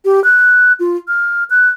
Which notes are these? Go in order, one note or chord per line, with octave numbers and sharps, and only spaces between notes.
G4
F#6
F4
F6
F#6